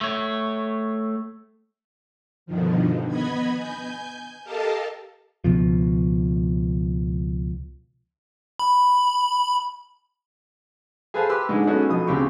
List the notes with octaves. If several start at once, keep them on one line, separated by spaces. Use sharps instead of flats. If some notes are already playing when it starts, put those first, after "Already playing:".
A3 C#5
G2 B2 D3 D#3 F3
B3 D#5 B5 G#6
G#5 G6
G4 A4 A#4 D#5 F5 A5
C#2 B2 F3
B5
G#4 A4 B4 C5 F5 A5
G4 B4 C6 E6
G#2 D3 G#3
G#3 B3 C#4 D#4 F#4 A4
A#1 B2 A4 D#6
D2 C#3 C4 G4 C#6